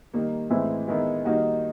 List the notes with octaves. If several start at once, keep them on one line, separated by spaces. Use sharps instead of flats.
D#3 G3 A#3
A2 E3 G#3 C4 E4
D#3 G#3 B3 E4
D#3 G3 A#3 D#4 F#4